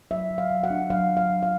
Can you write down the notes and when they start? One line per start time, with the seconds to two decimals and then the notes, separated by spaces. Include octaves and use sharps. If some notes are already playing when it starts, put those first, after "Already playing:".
0.11 F#3 E5
0.31 F#3
0.38 F5
0.51 F#3
0.64 F#5
0.70 D4
0.90 F#3 F5
1.09 D4
1.17 F5
1.29 F#3
1.43 F5